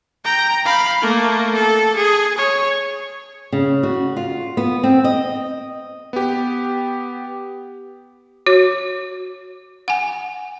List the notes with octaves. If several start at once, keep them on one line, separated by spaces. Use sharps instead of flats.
G5 A#5
F5 B5
A3 A#3
A4
G#4
C#5
C#3
F#4
F4
B3
C4
D#5
B3 G4
F#4 C#5
F#5 G#5